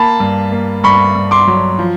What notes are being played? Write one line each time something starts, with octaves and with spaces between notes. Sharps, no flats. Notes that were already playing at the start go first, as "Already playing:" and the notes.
Already playing: A#3 A5 B5
G2
A#3
G2 B5 C#6
G2
C6 D6
F#3
F3